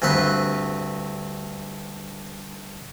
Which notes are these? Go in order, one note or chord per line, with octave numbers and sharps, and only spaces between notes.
D2 G2 C4 B4 C6